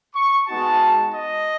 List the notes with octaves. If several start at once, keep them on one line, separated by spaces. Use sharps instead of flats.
C#6
G#3 B3 D#4 F#4 A5
D#5